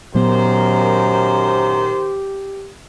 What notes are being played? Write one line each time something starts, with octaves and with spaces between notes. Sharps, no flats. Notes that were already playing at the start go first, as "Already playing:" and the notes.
F#2 A#2 D#3 F#3 B3 G4 A#4 C5